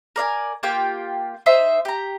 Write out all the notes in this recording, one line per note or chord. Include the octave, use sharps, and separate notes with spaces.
A#4 D5 E5 G#5
A#3 F4 G4 G5
D#4 C5 D#5 E5
G4 A#5